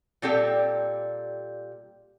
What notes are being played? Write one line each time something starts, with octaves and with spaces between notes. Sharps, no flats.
A#2 G3 C4 G4 A4 G5